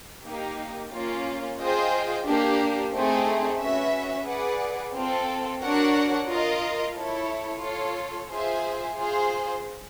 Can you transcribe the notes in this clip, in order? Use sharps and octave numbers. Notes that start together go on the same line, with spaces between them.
A#3 D#4 G4
A#3 C#4 F4
F4 G#4 C5 D#5 G5
A#3 D4 G4
A3 C4 D#4 G#4 C5
C#4 F#4 B4 E5
G#4 B4 D5 F#5
C4 F4 A4
D4 F#4 A#4 C#5 F#5
F4 A#4 D#5
E4 A4 C#5
F4 A4 C#5
F4 G#4 C5 E5 G#5
F4 G#4 C5